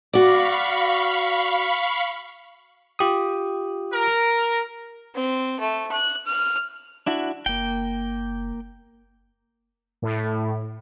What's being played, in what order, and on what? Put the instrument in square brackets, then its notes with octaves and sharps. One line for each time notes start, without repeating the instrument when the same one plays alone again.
[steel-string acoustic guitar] F#4 D5 [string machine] F5 B5 C#6
[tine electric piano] F4 G4 D#6
[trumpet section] A#4
[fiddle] C4
A3
F#6
F6
[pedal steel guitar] D4 E4 F#4
[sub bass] F#1 [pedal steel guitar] A#3 G5
[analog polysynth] A2